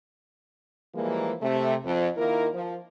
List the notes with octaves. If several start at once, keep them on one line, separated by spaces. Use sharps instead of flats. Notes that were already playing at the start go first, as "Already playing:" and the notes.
E3 F3 G3 G#3 A#3
C3 A3
F2
D#3 A#3 E4 F4 A#4
F3